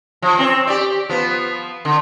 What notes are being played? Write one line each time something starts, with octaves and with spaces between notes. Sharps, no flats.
F3
C4 C#5
G4 D5
F3 B3
D3